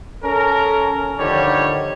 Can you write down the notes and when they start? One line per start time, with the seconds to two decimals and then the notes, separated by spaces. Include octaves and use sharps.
0.24 C#4 A4 A#4
1.18 D3 D#3 F3 G3 C#5